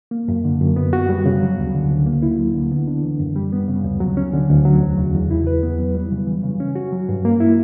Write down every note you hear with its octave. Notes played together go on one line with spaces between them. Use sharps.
A#3
F#2
D3
F#2
B3
F#4
G3
C#3
F#3
D2
D3
D2
A#3
E4
F#3
D3
B3
D4
E3
F#2
G3
B3
C#3
D2
F#3
C#4
D3
D2
F#3
E2
C#3
E2
E4
B4
B3
F#3
G3
C#3
E3
C#3
C#4
F#4
F#3
G2
A#3
E4